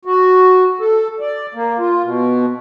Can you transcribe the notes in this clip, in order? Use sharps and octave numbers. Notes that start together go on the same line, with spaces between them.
F#4
A4
D5
A#3
F4
B2